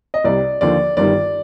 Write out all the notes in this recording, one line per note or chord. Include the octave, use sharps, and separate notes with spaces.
D#5
C2 C3 G3 D5
D#2 D3 F3 D5
G1 G2 D#3 G3 D5